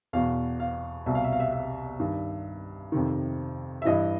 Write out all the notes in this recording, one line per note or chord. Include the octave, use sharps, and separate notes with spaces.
E2 B2 F5
F5
C2 B2 E5
F5
E5
F5
E5
E5
G2 D#3
F2 C3 D#3
E5
G2 E3 D#5